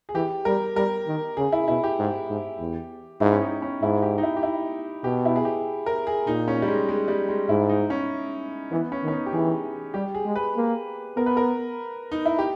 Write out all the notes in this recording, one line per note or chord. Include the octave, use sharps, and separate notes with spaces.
G#4
E3 G4
G3 A#4
G3 A#4
D#3
C#3 G#4
E4
B2 E4
G4
G#2
G#2
E2
G#2 E4
C#4
D#4
C#4
G#2 E4
G4
D#4
E4
G4
E4
B2 G4
E4
G#4
G4
A#4
G#4
A#2 D#4
C#4
G3
G#3
G#3
G3
G#3
G#2 E4
D#4
C#4
E3 B3
C#4
D#3
C#4
D#4
G4
E3 G#4
G3 G4
G#4
G#3
B4
A#3
B3 A#4
B4
A#4
D#4
E4
G4